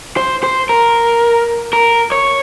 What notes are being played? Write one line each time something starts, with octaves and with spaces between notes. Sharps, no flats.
C5
C5
A#4
A#4
C#5